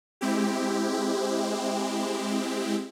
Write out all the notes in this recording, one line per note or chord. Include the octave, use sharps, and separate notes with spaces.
G#3 C4 E4 G4